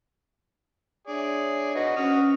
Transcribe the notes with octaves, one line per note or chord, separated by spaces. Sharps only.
D4 G#4 C#5 D5 E5
D#4 F#4 B4
C#4 F#4 C5 D#6 F6